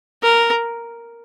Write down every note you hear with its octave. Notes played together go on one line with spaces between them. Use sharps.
A#4